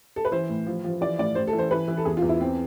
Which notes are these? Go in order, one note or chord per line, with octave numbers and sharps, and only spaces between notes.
A4
B4
E3 C5
A2
F3
F3
E3 D5
A2 D5
A2 C5
A4
E3
C5
E3 B4
E3
A4
E2 G#4
F4
E2
E4
E3 C4